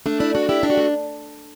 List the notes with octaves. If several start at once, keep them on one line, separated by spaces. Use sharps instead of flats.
A3 D4
D4 E4
D4 F#4
E4 G4
D4
F#4
A3